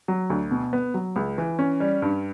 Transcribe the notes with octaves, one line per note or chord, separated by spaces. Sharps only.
F#3
D2
B2
B3
F#3
C#2
E3
C#4
G3
G2